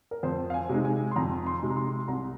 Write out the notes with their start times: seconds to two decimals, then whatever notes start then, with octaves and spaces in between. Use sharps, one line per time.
0.11 A#4
0.23 F2 C5
0.50 F5
0.54 G#5
0.69 C3 G#3 D#4
0.85 G#5
1.11 C6
1.16 F2 A#5
1.46 C6
1.61 C3 G#3 D#4
1.70 A#5
1.77 C6
2.08 C2 A#5